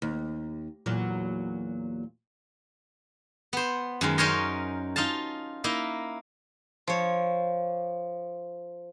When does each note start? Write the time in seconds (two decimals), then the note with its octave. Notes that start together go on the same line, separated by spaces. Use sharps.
0.02 D#2
0.86 E2 A#2 F#3
3.53 B3 C5
4.01 F#2 D#3 G#3
4.18 C#4 D#4 A#4 C5 C#5 D#5
4.96 D#4 F4 F5 A5
5.64 A#3 D#4 E4
6.88 F3 C#5